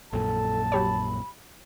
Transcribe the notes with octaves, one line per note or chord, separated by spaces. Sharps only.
A#1 F#2 A#2 A4 A5
F#3 G4 C#5 B5